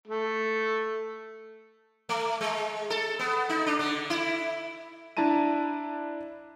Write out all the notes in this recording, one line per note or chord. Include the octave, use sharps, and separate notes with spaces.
A3
A3
G#3
A4
B3
D#4
D4
D3
E4
D4 E4 A5 A#5 D#7